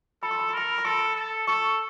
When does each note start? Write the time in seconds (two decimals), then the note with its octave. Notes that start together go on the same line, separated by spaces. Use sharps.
0.23 A4 B5
0.31 C6
0.40 B5
0.49 C6
0.54 A#4 B5
0.78 B5
0.85 A4 C6
1.16 A4
1.47 A4 C#6